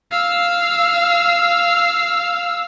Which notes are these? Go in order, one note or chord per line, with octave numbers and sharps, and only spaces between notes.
F5 E6